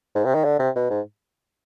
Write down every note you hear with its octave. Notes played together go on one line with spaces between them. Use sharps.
G#2
C3
D#3
D3
C3
B2
G#2